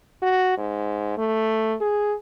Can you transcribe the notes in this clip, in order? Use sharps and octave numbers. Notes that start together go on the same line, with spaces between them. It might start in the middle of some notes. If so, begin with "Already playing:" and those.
F#4
G#2
A3
G#4